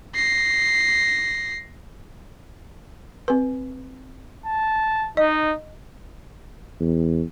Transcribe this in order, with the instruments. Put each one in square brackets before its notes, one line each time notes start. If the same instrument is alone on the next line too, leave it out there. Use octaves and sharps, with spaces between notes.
[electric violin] A#6 C7
[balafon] C4 B4
[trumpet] A5
[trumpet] D#4 [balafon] D#5
[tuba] E2